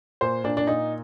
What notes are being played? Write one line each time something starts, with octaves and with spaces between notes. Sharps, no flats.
A#2 C5
A#2 D4
D4
A#2 D#4